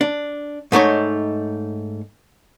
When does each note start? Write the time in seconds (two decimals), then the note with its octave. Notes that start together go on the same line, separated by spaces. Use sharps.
0.01 D4
0.72 G#2 A3 D#4 C#5